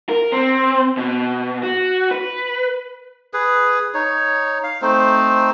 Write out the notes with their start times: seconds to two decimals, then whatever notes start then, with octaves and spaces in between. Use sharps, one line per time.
0.09 A#4
0.32 C4
0.97 B2
1.63 F#4
2.11 B4
3.34 G#4 B4
3.94 D#4 C#5
4.64 F5
4.82 A3 C4 D#4 C5